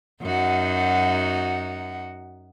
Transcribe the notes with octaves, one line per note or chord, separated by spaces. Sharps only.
F#2 D#4 F#4